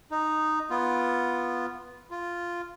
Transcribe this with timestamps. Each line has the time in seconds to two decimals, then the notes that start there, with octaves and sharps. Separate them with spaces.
0.11 D#4
0.70 B3 F4
2.11 F4